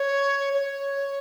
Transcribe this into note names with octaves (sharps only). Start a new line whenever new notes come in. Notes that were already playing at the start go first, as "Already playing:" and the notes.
Already playing: C#5
C#5